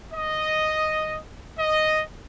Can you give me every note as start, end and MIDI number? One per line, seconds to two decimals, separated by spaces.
0.14 1.18 75
1.58 2.02 75